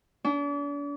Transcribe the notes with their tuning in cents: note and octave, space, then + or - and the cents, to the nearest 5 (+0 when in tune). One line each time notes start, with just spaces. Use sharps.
D4 -40